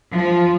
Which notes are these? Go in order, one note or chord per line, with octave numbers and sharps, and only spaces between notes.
F3